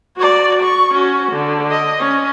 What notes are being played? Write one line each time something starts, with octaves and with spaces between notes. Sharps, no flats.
F#4 D5
C#6
C#4 F#4
D3
D#5
C#4